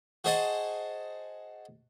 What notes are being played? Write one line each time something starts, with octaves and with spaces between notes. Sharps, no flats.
F#4 G#4 C5 D#5 F#5 A5